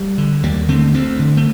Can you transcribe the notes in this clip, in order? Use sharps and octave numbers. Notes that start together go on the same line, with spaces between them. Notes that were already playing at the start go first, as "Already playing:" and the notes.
Already playing: G3
D3
D#2 G3 A#3
D3 A3 C4
D2 A3 C4
D3
A3